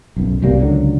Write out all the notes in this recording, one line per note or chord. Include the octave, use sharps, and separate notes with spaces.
B1 F#2
C2 B2 G3 A#3
C#2 D3 F#3